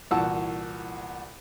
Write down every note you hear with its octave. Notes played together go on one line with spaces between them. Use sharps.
C2 A#2 E3 F#4 A5 E6